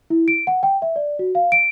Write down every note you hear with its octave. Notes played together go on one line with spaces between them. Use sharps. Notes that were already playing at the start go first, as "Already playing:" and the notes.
E4
D7
F#5
G5
E5
D5
F#4
F5
D7